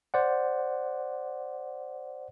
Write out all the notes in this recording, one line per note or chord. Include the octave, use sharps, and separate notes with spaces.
C5 D5 F#5